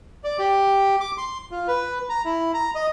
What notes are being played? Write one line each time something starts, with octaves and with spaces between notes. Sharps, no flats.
D5
G4
D6
C6
F4
B4
A#5
E4
A#5
D#5